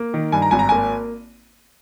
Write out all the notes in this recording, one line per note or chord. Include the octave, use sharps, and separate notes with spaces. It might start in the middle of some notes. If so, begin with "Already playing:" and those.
Already playing: A#3
D#3
G2 G#5
A#5
G#1 G#5
A#5
A#3 G#5